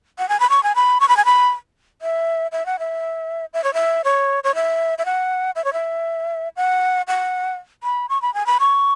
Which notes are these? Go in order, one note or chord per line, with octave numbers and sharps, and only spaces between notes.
F#5
G#5
B5
C#6
G#5
B5
C#6
B5
G#5
B5
E5
E5
F#5
E5
E5
C#5
E5
C#5
C#5
E5
E5
F#5
E5
C#5
E5
F#5
F#5
B5
C#6
B5
G#5
B5
C#6